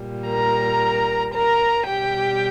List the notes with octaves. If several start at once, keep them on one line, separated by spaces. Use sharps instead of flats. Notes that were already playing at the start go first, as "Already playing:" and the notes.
Already playing: A#2 G3
A#4 A#5
A#4 A#5
B2 G3 G4 G5